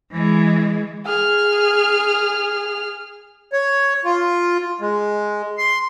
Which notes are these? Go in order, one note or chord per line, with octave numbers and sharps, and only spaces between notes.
E3 G#3
G#4 F6
C#5
F4
G#3
C6